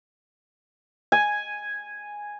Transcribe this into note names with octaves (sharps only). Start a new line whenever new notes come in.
G#5